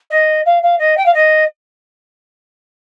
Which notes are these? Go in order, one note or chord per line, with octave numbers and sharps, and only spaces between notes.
D#5
F5
F5
D#5
G5
F5
D#5